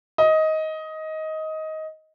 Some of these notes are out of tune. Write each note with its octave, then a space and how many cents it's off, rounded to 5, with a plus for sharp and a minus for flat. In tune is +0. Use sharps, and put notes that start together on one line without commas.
D#5 +15